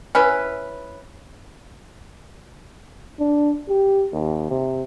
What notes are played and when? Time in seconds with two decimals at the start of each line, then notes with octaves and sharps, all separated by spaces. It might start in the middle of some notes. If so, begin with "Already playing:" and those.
0.15 C#4 E4 B4
3.20 D4
3.69 G4
4.13 D#2
4.51 C3